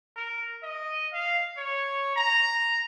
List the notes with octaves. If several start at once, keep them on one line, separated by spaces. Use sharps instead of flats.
A#4
D#5
F5
C#5
A#5